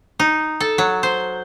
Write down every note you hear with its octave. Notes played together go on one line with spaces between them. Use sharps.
D#4
A4
F#3
C5